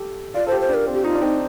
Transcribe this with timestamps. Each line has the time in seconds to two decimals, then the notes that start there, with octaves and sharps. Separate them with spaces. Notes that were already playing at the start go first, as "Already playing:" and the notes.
Already playing: G4 A4
0.34 F4 D5
0.47 A4 C5
0.52 G4
0.60 C5
0.69 D4
0.74 A#4
0.87 C4
0.94 G4
1.04 D#4 F4
1.15 D4
1.21 C4 D#4